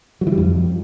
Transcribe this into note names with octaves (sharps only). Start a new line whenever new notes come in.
F#3
E3
G3
F2